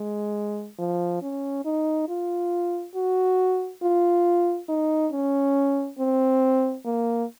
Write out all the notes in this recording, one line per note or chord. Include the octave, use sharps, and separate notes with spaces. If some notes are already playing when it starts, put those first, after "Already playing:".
Already playing: G#3
F3
C#4
D#4
F4
F#4
F4
D#4
C#4
C4
A#3